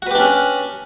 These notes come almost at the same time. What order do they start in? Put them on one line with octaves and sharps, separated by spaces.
F#4 B4 G4 D4 C#4